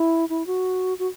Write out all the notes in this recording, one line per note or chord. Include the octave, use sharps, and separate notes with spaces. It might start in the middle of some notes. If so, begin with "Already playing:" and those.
Already playing: E4
E4
F#4
F#4